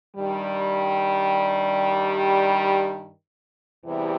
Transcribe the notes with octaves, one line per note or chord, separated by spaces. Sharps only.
G2 D#3 G3
E2 C3 E3 G3